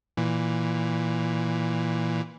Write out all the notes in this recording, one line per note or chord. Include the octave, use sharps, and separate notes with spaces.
A#2 E3